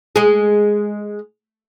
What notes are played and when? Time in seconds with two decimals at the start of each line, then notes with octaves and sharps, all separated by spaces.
0.16 G#3 G#4